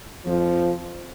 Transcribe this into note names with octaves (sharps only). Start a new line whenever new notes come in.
F2 F3